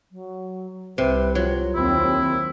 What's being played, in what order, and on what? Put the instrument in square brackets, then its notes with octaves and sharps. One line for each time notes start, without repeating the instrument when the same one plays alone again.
[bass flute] F#3
[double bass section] C2 [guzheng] C3 [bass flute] B4
[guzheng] F#3 [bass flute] F4
[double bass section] D#2 C4 [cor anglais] E4